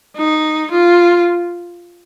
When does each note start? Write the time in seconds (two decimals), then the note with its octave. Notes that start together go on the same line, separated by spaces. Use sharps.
0.16 D#4
0.71 F4